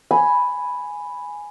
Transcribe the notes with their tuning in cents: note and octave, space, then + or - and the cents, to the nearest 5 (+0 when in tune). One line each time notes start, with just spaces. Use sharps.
G#5 +0 B5 +0